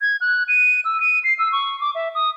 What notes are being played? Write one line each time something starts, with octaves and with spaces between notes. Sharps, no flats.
G#6
F#6
D#7
E6
D#7
C7
E6
C#6
D6
E5
D#6